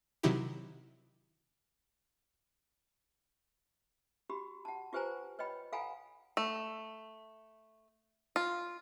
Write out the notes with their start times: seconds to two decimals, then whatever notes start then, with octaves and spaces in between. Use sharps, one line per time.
0.23 C3 D#3 F#3 E4 G4
4.30 F#4 G4 B5
4.65 F#5 A5
4.93 F4 G4 B4 C5 G#5 A#5
5.39 B4 C#5 D#5 G5 B5
5.72 A4 F5 F#5 G#5 A#5 B5
6.37 A3
8.36 F4